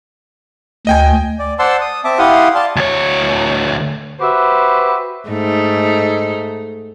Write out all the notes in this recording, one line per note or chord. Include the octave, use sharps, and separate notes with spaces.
D2 D#5 G5 G#5
D5
C5 D5 F#5 A5 C6 E6
D#6
C4 E5 A5 D6
E4 G4 F5 F#5 C6 D#6
D5 F5 A5 C6
D2 C#5
F#4 G4 B4 C5 E5
G#2 A3 D#4